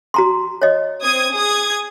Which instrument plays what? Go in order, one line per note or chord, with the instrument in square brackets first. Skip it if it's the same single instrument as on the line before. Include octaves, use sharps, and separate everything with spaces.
[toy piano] F#4 A#5 C6
C#5 D#5
[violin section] C4 D#6 G#6
G#4 D#6 G#6